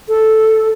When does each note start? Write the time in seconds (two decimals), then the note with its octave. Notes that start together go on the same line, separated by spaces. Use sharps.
0.09 A4